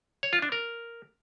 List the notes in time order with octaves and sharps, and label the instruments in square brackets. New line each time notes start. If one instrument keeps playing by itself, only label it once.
[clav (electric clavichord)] C#5
F4
D4
A#4